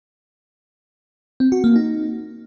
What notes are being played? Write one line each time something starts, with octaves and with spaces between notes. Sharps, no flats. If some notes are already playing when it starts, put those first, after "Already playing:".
C4
F#4
A#3
D#4